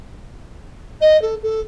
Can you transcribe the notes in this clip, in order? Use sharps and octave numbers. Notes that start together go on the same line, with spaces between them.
D#5
A4
A4